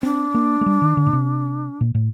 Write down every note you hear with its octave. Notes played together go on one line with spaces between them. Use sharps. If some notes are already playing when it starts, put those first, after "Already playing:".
C4 D4
A#3
A3
G3
D#3
D3
A#2
C3
A#2
A2